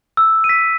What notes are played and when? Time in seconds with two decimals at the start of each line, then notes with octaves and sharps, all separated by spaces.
0.17 E6
0.44 D#7
0.49 B6